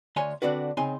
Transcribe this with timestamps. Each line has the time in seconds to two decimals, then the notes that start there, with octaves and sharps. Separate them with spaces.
0.16 D2 C#5 G#5 C6
0.42 D3 C4 D4 F#4 B4
0.77 C#3 C4 D#4 G#5 C6